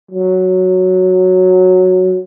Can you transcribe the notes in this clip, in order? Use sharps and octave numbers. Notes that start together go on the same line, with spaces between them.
F#3